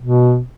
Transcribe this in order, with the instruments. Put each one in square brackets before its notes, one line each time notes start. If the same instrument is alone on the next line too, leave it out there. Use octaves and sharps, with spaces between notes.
[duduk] B2